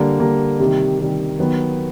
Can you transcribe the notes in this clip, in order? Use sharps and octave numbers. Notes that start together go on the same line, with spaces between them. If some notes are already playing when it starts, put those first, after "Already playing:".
Already playing: D3 G3 A#3
D3 G3 A#3
C3 D#3 G3
C3 D#3 G3
D#3 F#3 B3